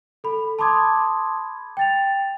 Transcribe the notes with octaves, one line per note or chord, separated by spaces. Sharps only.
A4 B5
A5 B5 C6 D6 D#6 G#6
G5 A6 F7